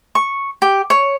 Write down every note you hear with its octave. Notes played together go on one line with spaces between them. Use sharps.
C#6
G4
C#5